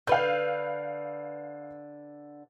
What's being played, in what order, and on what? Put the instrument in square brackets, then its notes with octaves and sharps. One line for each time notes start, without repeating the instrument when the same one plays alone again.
[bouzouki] D3 B4 [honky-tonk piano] F5 G6